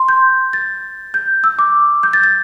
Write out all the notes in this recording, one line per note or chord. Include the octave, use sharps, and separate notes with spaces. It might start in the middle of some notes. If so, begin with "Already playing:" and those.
Already playing: C6
G6
A6
G6
E6
D6
G6
A6
A6